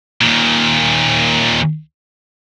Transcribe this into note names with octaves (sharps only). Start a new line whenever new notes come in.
D#2 A#2